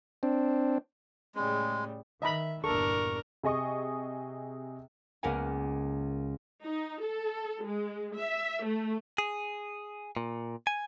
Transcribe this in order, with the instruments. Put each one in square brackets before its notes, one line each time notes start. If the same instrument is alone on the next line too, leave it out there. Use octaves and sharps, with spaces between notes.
[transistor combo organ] C4 D4
[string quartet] A2 C#3 G3 [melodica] G#3
[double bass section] D#3 [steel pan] D#5 A#5 B5 [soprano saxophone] E5
[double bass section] G1 E2 A#2 [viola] D4 A#4 [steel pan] A4 [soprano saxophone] C#6
[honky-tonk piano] C3 G#4 D#5 C#6 D#6
[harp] C#2 A#3 B3 A#4 F#5 G#5
[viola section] D#4
A4
G#3
E5
A3
[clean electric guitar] G#4
A#2
G#5